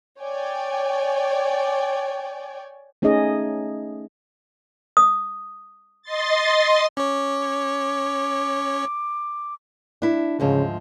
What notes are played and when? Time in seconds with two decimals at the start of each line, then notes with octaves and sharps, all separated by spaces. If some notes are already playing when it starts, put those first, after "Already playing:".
0.20 C#5 D5 G5 G#5
3.02 A3 C#4 D#4 G#4 D#5
4.97 D#6
6.02 D#5 C6 A6
6.97 C#4 C#5 D6
10.02 D4 E4
10.40 D2 G#2 C#3 F3